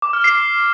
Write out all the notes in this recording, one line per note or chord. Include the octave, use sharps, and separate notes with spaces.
D6
F6
C7